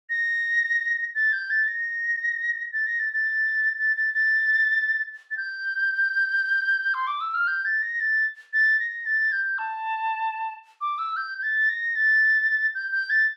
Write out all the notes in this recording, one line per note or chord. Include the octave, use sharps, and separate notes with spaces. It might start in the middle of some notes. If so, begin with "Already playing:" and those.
A#6
A6
G6
A6
A#6
A6
A#6
A6
A6
A6
A6
A6
A6
G6
C6
D6
E6
F6
G6
A6
A#6
A6
A6
A#6
A6
G6
A5
D6
E6
G6
G6
A6
A#6
A6
G6
G6
A6